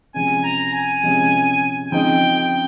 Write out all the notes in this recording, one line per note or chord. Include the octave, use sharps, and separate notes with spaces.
C3 F3 G#3 C#4 G#5
A#5
G#5
C3 F3 G#3 C#4
C#3 F3 C4 D#4 G5
G5